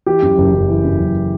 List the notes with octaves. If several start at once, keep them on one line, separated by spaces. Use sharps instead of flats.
E3 G4
F#2
F#1
F#1
E3
F#2
F#1